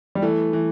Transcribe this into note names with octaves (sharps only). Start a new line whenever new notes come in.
G3
E3 A3
E3